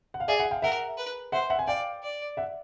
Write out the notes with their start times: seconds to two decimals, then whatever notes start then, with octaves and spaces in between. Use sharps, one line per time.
0.14 F#5
0.20 F5
0.28 G#4 D5 E5
0.40 E5 F#5
0.51 F5 G5
0.62 A#4 E5 F#5
0.97 B4
1.32 C5 E5 F#5
1.50 E5 F#5
1.59 G#5
1.67 D5 F5 G5
2.03 D5
2.37 E5 F#5